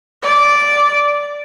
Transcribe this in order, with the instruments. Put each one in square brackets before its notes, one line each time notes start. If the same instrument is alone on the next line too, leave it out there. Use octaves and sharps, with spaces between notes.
[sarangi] D5